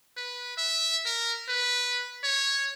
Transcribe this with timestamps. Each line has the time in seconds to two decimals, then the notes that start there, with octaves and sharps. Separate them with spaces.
0.17 B4
0.57 E5
1.06 A#4
1.49 B4
2.24 C#5